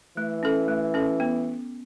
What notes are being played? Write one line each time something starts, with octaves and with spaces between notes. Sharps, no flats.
E3 A3
C#4 A4
A3
C#4 A4
B3